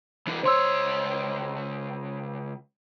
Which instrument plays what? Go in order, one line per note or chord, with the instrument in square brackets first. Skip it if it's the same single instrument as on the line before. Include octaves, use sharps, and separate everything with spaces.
[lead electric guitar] E3 D4
[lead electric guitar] C#2 C#5 [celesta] C5 C6 E6